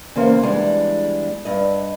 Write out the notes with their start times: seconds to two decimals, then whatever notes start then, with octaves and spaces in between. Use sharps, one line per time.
0.16 E2 C#3 A#3 A#4 C5
0.43 E2 G3 G#3 D4
1.45 G2 D#5